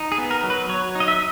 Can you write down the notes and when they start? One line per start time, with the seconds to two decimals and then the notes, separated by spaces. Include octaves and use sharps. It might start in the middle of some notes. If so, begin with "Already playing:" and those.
Already playing: D#4
0.12 G#4
0.18 B3
0.31 A#4
0.43 F#3
0.50 B4
0.69 F#3 C#5
0.95 D#4
1.00 D#5
1.08 E5